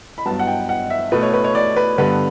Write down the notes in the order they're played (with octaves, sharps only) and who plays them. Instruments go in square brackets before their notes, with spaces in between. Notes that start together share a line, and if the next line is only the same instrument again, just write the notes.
[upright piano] B5
G2 F#3 B3 A5
F#5
G5
F#5
E5
B2 A3 B4
C#5
B4
C#5
D5
B4
G2 D3 G3 B3 B4